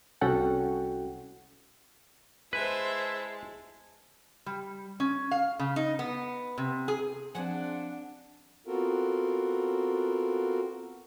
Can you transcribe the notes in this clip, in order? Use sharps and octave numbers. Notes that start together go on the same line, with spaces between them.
C2 C#4 F#4 A4 F#5 G5
G#3 E4 B4 C5 E5 A5
G3
C#4
F5
C#3
D#4
B3
C3
G#4
F3 C4 D4 G#4 C5 F#5 G#5
B3 C4 F4 F#4 A4 A#4